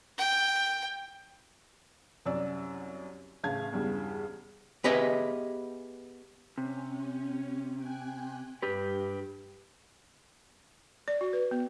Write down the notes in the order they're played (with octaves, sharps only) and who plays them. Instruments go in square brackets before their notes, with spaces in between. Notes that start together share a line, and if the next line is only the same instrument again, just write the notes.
[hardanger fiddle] G5
[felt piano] C2 F#2 D5 E6
A1 C#3 C#4 F5 A5 G#6
E2 G2 C#3 G3
[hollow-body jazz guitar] B3 G4 G#4 B4 D#5 E5
[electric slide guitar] C3 [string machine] C#4
[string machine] G5 G#5 F#6
[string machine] G2 [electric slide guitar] G4 B4
[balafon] D5
F#4
B4
B3